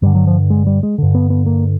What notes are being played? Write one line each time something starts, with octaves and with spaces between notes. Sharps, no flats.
G2 D3 G3
F#3
F3
G#3
G3
G#3
G2 D3
B3
B3
A#3